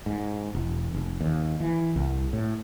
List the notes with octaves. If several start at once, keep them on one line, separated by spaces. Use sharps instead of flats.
G#2
E1
F1
D#2
E3
C2
A2